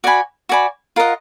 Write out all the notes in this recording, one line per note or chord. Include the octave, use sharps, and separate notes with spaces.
F#4 D5 G#5 B5
F#4 D5 G#5 B5
F4 A#4 D#5 F#5